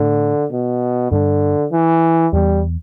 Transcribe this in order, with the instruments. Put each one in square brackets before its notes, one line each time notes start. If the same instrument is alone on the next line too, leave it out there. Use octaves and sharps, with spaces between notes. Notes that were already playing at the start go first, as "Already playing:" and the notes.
Already playing: [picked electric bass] A2 A3 D4 [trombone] D3
[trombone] B2
[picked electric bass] G2 G3 D4 [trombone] D3
[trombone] E3
[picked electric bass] E2 E3 B3 [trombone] G3